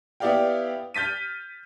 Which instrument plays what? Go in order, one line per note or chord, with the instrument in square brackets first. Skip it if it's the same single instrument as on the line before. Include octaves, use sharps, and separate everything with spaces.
[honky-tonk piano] B3 E4 G4 D5 F5 G5
F6 G6 A6 B6 D#7